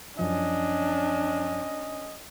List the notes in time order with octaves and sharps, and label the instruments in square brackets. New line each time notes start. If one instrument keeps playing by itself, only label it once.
[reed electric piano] F#2 F3 [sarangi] C#4 [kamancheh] D4 [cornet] D#5